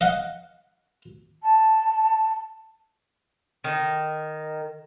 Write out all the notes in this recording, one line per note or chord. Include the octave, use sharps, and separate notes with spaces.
D#5 F5 F#5
A5
D#3